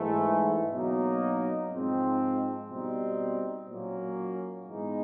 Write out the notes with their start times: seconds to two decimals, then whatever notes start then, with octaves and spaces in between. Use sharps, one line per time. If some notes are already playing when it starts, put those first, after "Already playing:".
Already playing: G#2 E3 A3
0.71 B2 F#3 A#3 D#4
1.70 G#2 F3 G#3 C4 D#4
2.69 B2 G3 C4 D#4
3.68 A#2 F#3 A#3 C#4
4.67 G#2 E3 G#3 B3 D#4